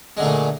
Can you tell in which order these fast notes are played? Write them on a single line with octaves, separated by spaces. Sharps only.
G#3 D3 A3 A#2